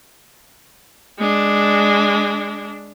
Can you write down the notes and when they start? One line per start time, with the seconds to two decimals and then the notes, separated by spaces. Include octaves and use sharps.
1.19 G#3 D4